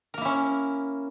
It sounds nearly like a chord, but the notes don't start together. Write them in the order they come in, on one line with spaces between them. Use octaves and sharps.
A#4 A#3 E4 C#4